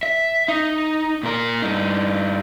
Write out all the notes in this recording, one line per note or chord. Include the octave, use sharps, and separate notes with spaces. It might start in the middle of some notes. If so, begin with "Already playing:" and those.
E5
D#4
A#2 A#4
G2 D#4